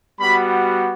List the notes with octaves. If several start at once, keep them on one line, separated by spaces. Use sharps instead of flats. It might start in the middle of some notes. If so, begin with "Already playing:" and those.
G3 B3 F#4 B5